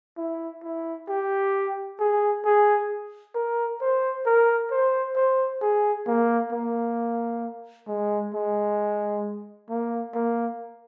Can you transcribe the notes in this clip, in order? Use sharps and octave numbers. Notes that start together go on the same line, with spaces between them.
E4
E4
G4
G#4
G#4
A#4
C5
A#4
C5
C5
G#4
A#3
A#3
G#3
G#3
A#3
A#3